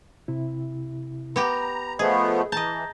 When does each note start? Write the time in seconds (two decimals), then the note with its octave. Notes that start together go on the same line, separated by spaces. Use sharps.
0.28 C3 E4
1.36 B3 G4 A#5
1.99 F3 A3 B3 G#4 D#5
2.52 E3 D#5 A5 A#5 G6